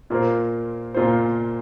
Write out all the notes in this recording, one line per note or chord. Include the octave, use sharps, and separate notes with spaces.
A#2 A#3 F4 C5
A#2 A#3 F4 C5